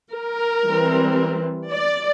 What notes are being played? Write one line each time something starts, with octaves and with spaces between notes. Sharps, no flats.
A#4
E3 G3 C4
D5